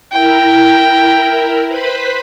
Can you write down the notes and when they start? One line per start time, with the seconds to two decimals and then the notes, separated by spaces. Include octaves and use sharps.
0.11 E4 A#4 G5
1.68 B4 C5 B5